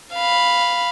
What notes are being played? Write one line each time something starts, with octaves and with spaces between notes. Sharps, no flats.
F5 B5